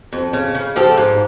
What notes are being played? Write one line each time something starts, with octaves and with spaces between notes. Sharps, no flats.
F2
C#3
C#3
F3 G4 A4
G#2